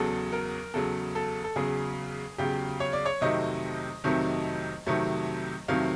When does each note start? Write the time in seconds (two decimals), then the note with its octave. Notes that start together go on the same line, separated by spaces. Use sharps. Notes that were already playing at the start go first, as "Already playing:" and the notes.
Already playing: E2 C#3 F#3 A4
0.33 A#4
0.74 E2 C#3 F#3 A4
1.15 A4
1.44 A4
1.56 E2 C#3 F#3 G#4
2.38 E2 C#3 F#3 G4
2.80 C#5
2.93 D5
3.06 C#5
3.21 F2 C3 D#3 F#3 A3 D#5
4.04 F2 C3 D#3 F#3 A3
4.86 F2 C3 D#3 F#3 A3
5.68 F2 C3 D#3 F#3 A3 F5